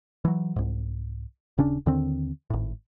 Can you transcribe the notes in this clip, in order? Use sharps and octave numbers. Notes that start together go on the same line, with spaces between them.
E3 F#3
C2 G#2
D#1 C#3 C#4 D4
D#2 D3 D#3 C4
G#1 A2